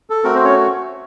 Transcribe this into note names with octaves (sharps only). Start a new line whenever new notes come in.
A4
A3 C4 F#4 A#4
C4 C5
C#4 C#5